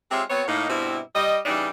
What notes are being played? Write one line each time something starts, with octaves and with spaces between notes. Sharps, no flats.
G#3 C4 F4 G4 C#5 E5
B3 C4 F#4 C#5
A2 A#3 D#4
G2 B2 G3 C4 E4
G3 D#5
C#3 E3 G3 D4 D#4